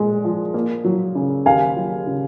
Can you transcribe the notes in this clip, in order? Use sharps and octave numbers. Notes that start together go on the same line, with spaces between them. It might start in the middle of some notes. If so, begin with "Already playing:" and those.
Already playing: A#2 G#3
F3
A#3
F#3
C#3
D#2 F5 G#5
F#3
C#3